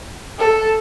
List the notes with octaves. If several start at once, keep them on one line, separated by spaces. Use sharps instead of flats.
A4